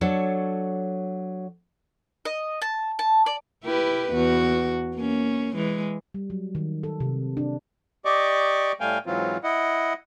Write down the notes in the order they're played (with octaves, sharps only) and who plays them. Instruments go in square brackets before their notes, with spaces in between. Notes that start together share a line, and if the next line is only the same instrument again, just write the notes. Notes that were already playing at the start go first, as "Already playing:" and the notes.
[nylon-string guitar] F#3 D4 A4 C#5
[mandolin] D#5
A5
A5
D5
[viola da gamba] E4 G4 B4
E2 F#4
A#3 C#4
E3 G#3
[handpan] G3
F#3
D#3
A4
C3
D4
[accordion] G4 D5 D#5 C#6 D6
A2 G3 A3 F5 G5 G#5
G#2 E3 F#3 C4 F4
E4 D#5 F#5